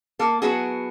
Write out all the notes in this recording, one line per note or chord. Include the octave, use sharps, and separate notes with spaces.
A#3 A4
F#3 B3 E4 F#4 G#4